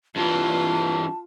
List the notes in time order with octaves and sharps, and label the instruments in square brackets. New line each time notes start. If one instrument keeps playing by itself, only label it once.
[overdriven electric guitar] G2 E3 [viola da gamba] F4 [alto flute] A5